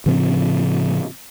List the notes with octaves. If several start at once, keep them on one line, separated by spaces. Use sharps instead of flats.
A2 C#3 F3 C4